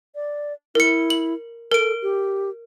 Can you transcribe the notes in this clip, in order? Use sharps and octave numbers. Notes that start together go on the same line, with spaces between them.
D5
E4 A#4 C#7
F#7
A4 A#4 D7
G4